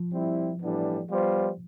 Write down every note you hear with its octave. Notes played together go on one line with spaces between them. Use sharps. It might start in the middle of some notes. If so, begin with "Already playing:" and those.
Already playing: F3
G3 C4 E4
A2 E3 G3 B3 D4
G3 B3 F4 C5